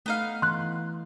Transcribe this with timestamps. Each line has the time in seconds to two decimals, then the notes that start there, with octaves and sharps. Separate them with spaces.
0.06 A3 B3 D#4 F5
0.42 E3 C6 F#6